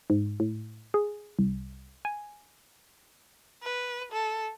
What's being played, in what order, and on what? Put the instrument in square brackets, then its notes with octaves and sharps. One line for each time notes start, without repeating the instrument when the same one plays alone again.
[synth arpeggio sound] G#2
A2
G#4
C2
G#5
[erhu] B4
A4